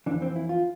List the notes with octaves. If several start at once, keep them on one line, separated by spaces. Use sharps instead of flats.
F2 E3 D4
C4
E4
F4